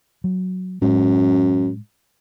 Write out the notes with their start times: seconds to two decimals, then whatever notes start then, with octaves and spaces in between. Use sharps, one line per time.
0.24 F#3
0.82 F#2 A2 G#3